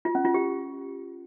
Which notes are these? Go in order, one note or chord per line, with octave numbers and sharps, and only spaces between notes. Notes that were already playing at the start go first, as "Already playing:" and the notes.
F4
C#4
F4
G4